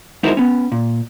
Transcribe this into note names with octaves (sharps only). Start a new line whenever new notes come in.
G#3 D#4 E4 F#4 A#4 C5
B3 C#4
A#2